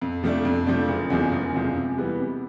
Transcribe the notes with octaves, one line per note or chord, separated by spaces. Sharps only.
F2
C3 F3 A3 D4
F2
C3 F3 A3 D4
F#1
E2 C3 F3 G#3
F#1
E2 C3 F3 G#3
C3
E3 G3 B3
C3